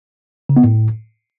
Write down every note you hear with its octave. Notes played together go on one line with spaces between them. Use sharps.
C#3
B3
A2